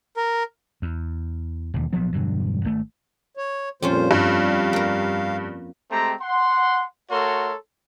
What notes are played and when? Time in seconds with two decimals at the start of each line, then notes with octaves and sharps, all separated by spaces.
0.17 A#4
0.82 E2
1.74 E1 D#2
1.93 A#1 F3 F#3 B3
2.13 E1 G2 D3 F#3
2.64 G#1 A3
3.37 C#5
3.82 F2 A#2 G3 C#4 F4 C5
4.11 G2 F5
4.73 A#3 A#4
5.91 G#3 A3 C4 G4 A#5
6.21 F#5 C6
7.11 A3 F#4 A4 A#4 C#5 C6